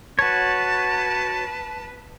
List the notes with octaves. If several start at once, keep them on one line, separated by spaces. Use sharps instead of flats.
F#4 B4 C#5 A5 A6